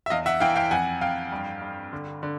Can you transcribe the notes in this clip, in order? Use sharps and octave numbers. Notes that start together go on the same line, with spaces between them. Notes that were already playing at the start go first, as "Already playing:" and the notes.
E5
E2 D#5 F5
E5 F#5
E3 F5 G5
F5 G5
F2 F#5 G#5
F2 F5 G5
G2
G2
D3
D3